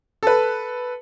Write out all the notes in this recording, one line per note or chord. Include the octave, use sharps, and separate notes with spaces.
A4 B4